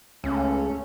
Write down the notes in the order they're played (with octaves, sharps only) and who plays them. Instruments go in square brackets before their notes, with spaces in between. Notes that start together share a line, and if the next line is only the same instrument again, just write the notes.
[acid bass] C#2 [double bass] A3 C#4